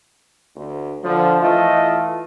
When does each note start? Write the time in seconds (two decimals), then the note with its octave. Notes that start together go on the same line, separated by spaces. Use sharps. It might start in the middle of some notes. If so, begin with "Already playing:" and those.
0.56 D2
1.04 D3 F3
1.42 E3 A3 F4 D#5